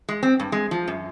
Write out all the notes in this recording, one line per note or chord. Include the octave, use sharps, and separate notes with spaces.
G#3
C4
G2
G#3
F3
F#2